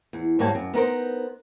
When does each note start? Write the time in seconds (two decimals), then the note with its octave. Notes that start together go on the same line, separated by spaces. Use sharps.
0.13 E2
0.39 D#2 G#2 G3 A#3 C#5 A5
0.55 F#2
0.74 B3 D#4 A#4 C5